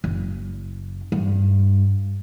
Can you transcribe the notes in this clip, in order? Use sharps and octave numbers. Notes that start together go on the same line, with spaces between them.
F#1
G2